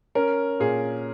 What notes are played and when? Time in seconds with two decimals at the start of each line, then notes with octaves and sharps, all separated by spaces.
0.15 C#4 A#4
0.60 A#2 G#4